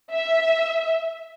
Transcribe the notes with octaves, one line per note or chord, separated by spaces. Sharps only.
E5